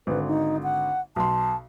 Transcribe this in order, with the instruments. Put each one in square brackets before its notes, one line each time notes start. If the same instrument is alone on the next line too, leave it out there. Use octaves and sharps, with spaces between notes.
[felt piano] G#1 D3 [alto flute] B4
[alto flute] D#4
F#5
[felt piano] B1 C6 [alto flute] A5